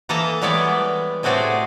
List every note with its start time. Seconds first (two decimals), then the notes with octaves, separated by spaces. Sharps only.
0.09 E3 A#3 A4 D#5 A5 A#5
0.42 E3 G3 G#3 B3 C#5 D5
1.23 A2 A3 C4 F#4 G#4 D5